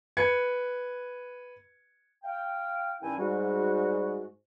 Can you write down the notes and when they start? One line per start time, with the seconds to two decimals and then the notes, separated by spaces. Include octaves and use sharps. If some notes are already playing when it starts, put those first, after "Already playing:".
0.17 B4 G#6 C#7
2.23 F5 G5
3.01 G2 D#3 C#4 E4 G5 G#5
3.18 G#2 G3 F#4